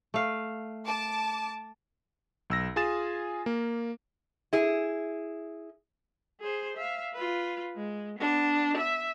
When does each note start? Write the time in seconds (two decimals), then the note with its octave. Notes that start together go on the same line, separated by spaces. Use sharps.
0.14 A3 F5
0.85 A5 D6
2.50 B1 E6 A#6
2.76 F4 G#4 G#5 D#6 A6 E7
3.46 A#3
4.53 E4 G#4
6.40 G#4 C5
6.77 E5 F5
7.14 F4 B4
7.76 G#3
8.19 B3 D4
8.77 E5